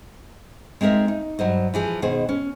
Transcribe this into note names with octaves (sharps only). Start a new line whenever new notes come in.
G#3 C4 D#4 A#4 E5
D#4
G2 F#3 C5 D#5
E3 F3 G#4
B2 D#3 G#4 C5
C#4